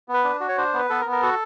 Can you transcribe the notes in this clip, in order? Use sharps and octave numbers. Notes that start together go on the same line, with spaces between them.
B3
B4
D4
F#4
C#5
D4 C5
B3 B4
B3 A4
A#4
B3
A#4
F#4 A4